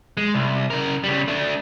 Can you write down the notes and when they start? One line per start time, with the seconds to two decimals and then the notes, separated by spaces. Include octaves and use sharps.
0.17 G#3
0.34 C2
0.70 C#3 A#4
1.04 C#3 G3
1.28 A3 D4